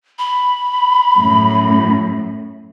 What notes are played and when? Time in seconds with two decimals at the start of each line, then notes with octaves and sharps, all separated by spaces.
0.19 B5
1.18 F#2 A2